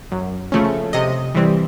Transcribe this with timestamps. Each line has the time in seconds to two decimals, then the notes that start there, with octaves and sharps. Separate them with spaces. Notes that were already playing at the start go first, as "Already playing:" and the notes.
0.12 F#2
0.52 C#3 F3 A3 C#4
0.93 C3 D#5
1.35 E3 G3 C4